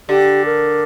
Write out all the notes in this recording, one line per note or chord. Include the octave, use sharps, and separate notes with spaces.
D3 G4
A#4